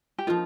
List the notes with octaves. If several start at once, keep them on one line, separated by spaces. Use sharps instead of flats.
G4
F3 A#3 D#4 F4